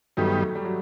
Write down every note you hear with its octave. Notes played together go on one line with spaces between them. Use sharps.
G2 D#3 F#3 G3 A3 B3
G3
F#3